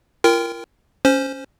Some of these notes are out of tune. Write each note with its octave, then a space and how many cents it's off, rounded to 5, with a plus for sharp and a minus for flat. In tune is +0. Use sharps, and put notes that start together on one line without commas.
F4 -35 A#4 +0 G5 +15
C#4 +0 C5 +0